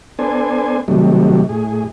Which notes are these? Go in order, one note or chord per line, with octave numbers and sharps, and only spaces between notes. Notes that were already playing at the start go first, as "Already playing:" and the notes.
B3 D4 A4 C5 G#5
C3 D#3 F#3 G3 A3
A2 G#4